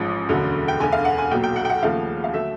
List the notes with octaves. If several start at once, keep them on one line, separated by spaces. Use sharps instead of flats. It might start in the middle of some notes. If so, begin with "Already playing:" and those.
Already playing: A1 G#2 F3
E1 D2 D3 F#3
G5
E1 D2 D3 G#5
F5
F#5
G#5
B1 A#2 F#3 G5
G5
F#5
G5
F#5
D#2 C#3 F3 A3 F5
F5
D3 F#3 A3 E5